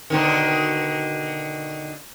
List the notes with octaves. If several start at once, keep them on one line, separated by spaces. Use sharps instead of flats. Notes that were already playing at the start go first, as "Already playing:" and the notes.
B2 D3 D#3